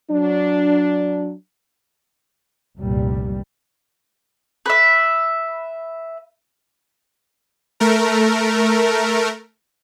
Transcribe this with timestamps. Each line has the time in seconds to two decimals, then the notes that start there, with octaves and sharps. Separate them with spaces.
0.11 F#3 D4
2.77 F1 C2 G2 A#2 G3
4.66 B4 E5
7.80 A3 A#4